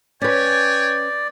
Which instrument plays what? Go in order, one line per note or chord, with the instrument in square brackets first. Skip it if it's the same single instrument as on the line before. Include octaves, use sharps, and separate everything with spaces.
[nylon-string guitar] C#4 B4 [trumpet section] C#5 G5 G#5 [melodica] D5